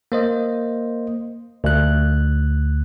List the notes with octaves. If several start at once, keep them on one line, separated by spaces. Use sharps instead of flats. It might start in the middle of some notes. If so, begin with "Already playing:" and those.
A#3 C5 D#5
D2 F#6